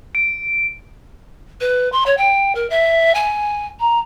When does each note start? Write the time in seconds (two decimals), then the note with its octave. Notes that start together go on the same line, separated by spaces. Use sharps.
0.15 D7
1.61 B4
1.92 C6
2.06 C#5
2.18 G5
2.55 A#4
2.70 E5
3.15 G#5
3.80 A#5